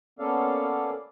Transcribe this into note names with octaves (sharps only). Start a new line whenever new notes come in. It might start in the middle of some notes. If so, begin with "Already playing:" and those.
A#3 B3 C#4 A4 D5 F5